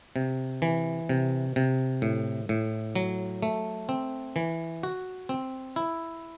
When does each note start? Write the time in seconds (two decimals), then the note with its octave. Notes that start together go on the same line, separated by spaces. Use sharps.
0.16 C3
0.62 E3
1.09 C3
1.56 C3
2.02 A2
2.49 A2
2.95 F#3
3.43 A3
3.89 C4
4.36 E3
4.83 F#4
5.29 C4
5.76 E4